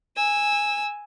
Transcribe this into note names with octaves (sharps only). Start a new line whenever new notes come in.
G#5 E6